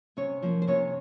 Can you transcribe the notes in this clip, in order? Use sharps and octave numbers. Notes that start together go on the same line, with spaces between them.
C3 C#4 C#5
F3 A#3 C#4
C5
C3 C#4 C#5